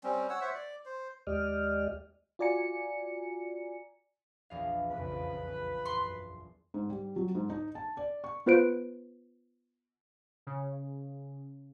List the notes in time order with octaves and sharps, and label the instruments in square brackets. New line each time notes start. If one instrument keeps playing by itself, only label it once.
[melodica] G3 C4 C#4
C#5 F#5 E6
C5 C#5 E5 F#5
D5
C5
[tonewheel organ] D#2 G#3 G4 D5 D#5 F6
[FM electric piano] F4 F#4 D5 G#5 A#5 C#7
[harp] A#1 E2 F5
[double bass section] B1 F2 C#3 [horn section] B4
[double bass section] F#2 [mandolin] C6
[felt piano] G#2
G3
F#3
G#2
D#4
A5
D5
C#6
[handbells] B3 F4 B4 C5 F#6 D7
[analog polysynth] C#3